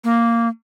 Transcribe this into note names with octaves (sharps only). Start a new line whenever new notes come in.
A#3